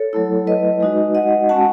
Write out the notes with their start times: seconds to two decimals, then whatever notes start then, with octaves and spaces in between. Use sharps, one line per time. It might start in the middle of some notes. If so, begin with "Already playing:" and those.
Already playing: A4 C#5
0.13 F#3 A3 E4
0.47 B4 D#5
0.80 G#3 D#4 F#4
1.15 D#5 F#5
1.49 G#3 C#4 F#4 F#5 A5